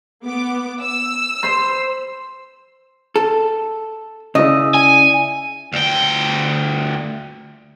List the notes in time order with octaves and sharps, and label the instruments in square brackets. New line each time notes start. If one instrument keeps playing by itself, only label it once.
[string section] B3 D6
E6
[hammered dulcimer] C5 B5 C6
[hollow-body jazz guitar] A4
[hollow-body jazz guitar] C#3 [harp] E4 D5 D#5
[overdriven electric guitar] G#5
[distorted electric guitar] D2 G5